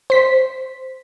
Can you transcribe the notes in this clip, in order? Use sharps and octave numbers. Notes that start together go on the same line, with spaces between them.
C5 B6